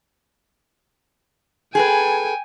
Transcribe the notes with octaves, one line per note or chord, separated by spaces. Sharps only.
G#4 A4 B4 G5 G#5